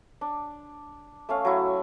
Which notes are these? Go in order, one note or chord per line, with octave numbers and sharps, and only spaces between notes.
D4
A3 C#4 F5
F#3 E4